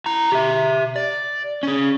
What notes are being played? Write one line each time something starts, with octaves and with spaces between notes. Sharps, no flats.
E4 A#5
G4 E5
D5
C#4 G#4